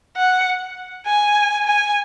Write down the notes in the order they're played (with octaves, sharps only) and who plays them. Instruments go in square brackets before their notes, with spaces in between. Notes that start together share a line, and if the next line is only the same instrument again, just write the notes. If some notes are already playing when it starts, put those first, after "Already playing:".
[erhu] F#5
G#5
G#5